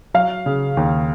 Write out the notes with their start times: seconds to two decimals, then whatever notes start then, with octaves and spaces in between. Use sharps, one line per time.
0.14 F#3 F5
0.46 C#3
0.77 D#2